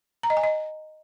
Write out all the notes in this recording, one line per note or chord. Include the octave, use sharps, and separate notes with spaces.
A#5
D#5
G#5
D#5